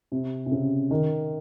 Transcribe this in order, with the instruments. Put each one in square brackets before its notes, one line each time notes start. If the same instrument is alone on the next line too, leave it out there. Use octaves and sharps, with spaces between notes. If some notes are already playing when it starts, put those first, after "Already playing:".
[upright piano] C3
C3
C#3
D#3